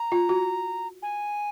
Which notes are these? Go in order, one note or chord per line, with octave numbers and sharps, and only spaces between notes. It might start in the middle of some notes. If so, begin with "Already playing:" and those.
Already playing: A#5
F4
F#4
G#5